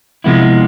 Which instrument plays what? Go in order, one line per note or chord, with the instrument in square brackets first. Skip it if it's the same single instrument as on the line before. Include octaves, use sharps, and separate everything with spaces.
[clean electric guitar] C3 F3 G#3 B3 E4